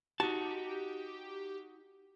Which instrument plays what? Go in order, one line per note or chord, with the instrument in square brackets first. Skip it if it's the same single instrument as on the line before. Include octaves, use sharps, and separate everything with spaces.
[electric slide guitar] D#4 F#4 [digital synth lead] G4 [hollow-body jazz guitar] A5